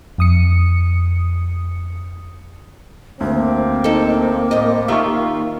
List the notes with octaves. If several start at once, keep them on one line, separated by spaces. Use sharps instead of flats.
F2 D#6 C#7
D2 A#3 C4
D#4 A4
A2 D#5
D#3 F4 G4 E5 F5 C#6